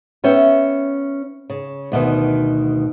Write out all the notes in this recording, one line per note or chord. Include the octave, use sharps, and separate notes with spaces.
B3 C#4 E5 G5
C#3
D2 B2 D#3